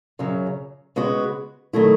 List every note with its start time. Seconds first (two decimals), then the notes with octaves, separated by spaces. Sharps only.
0.19 F#2 C#3 F#3
0.96 C#3 G#3 B3 F#4
1.73 D#3 F#3 A3 E4